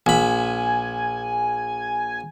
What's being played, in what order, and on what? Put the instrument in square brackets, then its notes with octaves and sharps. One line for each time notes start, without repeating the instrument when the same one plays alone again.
[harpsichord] A#1 B5 [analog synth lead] G#5